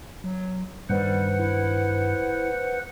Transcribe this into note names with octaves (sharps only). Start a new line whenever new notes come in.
F#3
G2 D#3 G3 B4 C5 F#5
E4